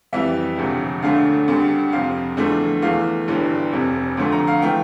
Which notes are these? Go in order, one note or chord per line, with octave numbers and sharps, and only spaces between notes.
F2 E3 G3 E5
E1 D2 C3 F3
E1 D2 D3 A3 F5
D2 D3 G3
F2 C3 F3 F5
E2 D3 F3 A3
E2 E3 A3 F5
G1 G2 E3 G3
F1 F2 C3
D2 D3 F3 A3
A#5
F5
E3 A3 G5